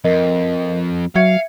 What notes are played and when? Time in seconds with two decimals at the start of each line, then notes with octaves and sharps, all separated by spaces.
0.05 F2 A#4 D#5
1.16 F#3 E5 F5 G#6 C#7